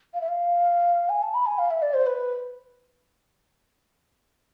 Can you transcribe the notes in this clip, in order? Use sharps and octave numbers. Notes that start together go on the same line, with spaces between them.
F5
E5
F5
G#5
A5
B5
G#5
F5
E5
D5
C5
B4